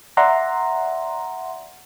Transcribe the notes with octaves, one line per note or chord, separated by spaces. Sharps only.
D5 E5 F#5 A#5 C6